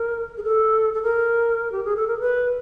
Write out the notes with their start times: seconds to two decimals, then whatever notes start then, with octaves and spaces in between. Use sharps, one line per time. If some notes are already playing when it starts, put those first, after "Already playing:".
Already playing: A#4
0.38 G#4
0.44 A4
0.94 A4
1.03 A#4
1.72 G4
1.85 G#4
1.97 A4
2.07 A#4
2.20 B4